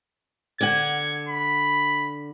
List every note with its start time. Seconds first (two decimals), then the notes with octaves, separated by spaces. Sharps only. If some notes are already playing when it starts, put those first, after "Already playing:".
0.61 D3 F#5 G#6
1.28 B5